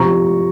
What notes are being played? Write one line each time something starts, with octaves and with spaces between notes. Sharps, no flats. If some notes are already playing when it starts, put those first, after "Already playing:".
Already playing: C3 F3 A#5 C#6